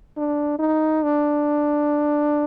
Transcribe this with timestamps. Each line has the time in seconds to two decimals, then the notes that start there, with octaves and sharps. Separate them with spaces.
0.17 D4
0.59 D#4
1.03 D4